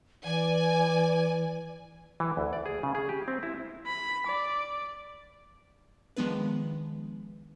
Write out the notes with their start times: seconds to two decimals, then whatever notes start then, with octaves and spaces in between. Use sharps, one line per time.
0.25 E3 D5 G#5
2.20 E3
2.37 D2
2.53 D5
2.66 G#4
2.83 C#3
2.95 G#4
3.09 G4
3.28 C4
3.43 E4
3.86 B5
4.27 D5
6.17 D#3 F3 G#3 B3 D4 B4